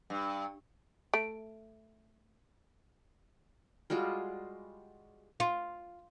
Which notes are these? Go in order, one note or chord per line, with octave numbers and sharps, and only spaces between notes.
G2
A3 D7
G3 G#3 F4 F#4
F4